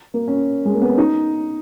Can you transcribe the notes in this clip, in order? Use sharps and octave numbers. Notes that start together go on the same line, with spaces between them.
A#3
C#4
G#3
A#3
B3
C#4
D#4